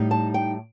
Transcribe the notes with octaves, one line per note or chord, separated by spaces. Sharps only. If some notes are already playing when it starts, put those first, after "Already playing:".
Already playing: A2 G3 D#4
A5
G5